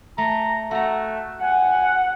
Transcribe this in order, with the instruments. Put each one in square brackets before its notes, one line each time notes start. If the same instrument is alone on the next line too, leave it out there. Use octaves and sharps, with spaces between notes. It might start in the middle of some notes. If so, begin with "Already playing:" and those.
[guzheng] A3 [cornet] A#5
[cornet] A3 [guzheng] F#4 A#5
[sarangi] F#5 [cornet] G#5